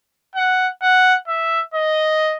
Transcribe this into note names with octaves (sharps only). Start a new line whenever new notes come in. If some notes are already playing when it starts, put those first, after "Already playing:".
F#5
F#5
E5
D#5